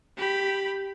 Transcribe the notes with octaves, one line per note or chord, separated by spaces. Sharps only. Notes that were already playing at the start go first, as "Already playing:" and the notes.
G4 B5